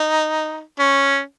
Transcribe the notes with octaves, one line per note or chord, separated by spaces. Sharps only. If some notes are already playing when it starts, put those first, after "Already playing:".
Already playing: D#4
C#4